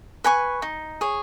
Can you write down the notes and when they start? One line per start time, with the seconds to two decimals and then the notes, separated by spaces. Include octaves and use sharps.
0.24 B4 G#5 C#6
0.62 D#4
1.01 G#4 C#5